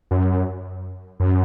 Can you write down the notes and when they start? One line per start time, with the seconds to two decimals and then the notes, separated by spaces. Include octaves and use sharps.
0.11 F#2
1.20 F#2